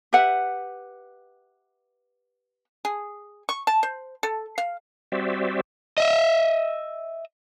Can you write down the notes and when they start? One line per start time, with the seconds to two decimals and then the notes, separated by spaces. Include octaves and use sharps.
0.13 G4 B4 E5 F#5
2.85 G#4
3.49 C#6
3.67 A5
3.83 C5
4.23 A4
4.58 F5
5.12 G3 C4 F#4 C5 D5 E5
5.98 D#5 E5